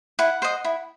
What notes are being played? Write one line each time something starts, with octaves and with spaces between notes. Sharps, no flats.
E4 F#5
C5 D#5
E4